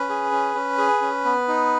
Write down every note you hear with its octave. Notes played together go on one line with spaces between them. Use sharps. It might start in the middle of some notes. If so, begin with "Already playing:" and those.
Already playing: C#4 B4
G#4
C#4
C#4
G#4
C#4
B3
D#4